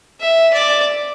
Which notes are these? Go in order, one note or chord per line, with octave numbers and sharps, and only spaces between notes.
E5
D5